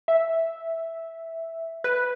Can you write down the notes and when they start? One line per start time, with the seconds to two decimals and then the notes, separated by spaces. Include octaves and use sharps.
0.08 E5
1.84 B4